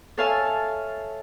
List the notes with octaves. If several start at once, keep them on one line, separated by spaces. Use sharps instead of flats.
A4 C#5 E5 F5 G#5 A5